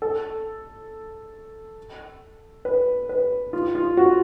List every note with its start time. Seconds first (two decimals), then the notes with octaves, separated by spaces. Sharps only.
0.02 A4
2.65 B4
3.09 B4
3.53 F4
3.75 F4
3.97 F#4